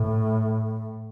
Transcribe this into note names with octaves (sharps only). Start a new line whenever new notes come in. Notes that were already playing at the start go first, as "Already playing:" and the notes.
Already playing: A2